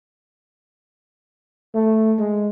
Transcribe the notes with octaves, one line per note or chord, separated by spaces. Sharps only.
A3
G#3